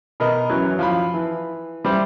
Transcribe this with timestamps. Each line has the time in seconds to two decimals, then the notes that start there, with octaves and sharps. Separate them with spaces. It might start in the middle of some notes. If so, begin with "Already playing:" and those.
0.20 B2 A#4 D#5
0.50 F#2 E3 F#3
0.79 F3 F5 B5
1.14 E3
1.85 G3 G4 C5 E5